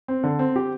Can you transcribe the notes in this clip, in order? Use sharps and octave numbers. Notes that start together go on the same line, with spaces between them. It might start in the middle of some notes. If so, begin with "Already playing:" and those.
C4
D3
C4
G4